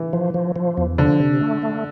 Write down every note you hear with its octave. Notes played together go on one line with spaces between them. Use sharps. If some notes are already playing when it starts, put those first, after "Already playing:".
Already playing: E3
F3
F3
F3
E2
D3 F3
C3
A3
A3